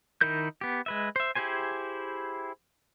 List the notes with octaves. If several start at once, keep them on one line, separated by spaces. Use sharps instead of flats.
D#3 D#4 E4 A#4 G6
B3 G4
G#3 B4 E5
C5 E5
E4 G4 G#4 C5 G#5